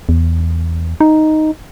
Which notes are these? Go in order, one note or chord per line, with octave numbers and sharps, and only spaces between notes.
E2
D#4